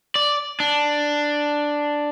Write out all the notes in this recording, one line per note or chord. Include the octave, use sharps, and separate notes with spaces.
D5
D4